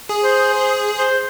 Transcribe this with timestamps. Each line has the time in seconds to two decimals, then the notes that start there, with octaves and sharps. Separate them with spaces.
0.09 G#4
0.23 C5
0.53 C5
0.98 C5